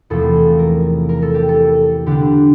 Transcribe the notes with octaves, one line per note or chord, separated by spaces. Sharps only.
E2 C3 F3 A3 C4 A4
A#4
A#4
A4
G4
A4
D3 G3 D4 G4